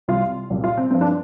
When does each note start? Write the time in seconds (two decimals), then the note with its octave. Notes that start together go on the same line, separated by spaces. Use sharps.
0.08 C2 C3 G3 F4
0.50 C2 A#2 G3
0.64 F4
0.77 C4
0.90 G2 F3 C4
1.01 D4